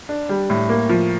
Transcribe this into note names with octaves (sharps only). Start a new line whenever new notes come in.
D4
G3
A2
A#3
F3